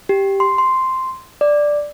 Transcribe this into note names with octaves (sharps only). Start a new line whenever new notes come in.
G4
C6
C6
D5